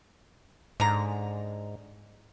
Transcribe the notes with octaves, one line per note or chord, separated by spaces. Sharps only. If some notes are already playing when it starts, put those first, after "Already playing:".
G#2 D3 A#5